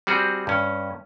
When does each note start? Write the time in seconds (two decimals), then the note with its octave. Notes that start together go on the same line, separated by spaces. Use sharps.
0.07 G3 C4 F#4 G#4
0.47 G2 C#4